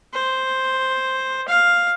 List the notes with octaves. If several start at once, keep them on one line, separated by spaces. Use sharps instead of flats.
C5
F5